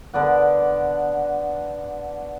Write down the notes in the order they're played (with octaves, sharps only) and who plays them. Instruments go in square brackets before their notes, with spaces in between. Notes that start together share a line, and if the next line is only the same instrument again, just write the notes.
[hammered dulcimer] D3 B3 D5 F#5